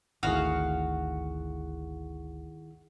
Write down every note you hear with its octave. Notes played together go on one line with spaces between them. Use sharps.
G#1 D2 D#3 E4 F#4 G#4 C#5 F5